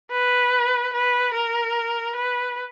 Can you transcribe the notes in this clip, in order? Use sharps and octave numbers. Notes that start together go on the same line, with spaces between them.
B4
B4
A#4
B4